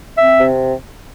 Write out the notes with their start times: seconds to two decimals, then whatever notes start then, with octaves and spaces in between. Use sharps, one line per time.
0.18 C4 E5
0.40 C3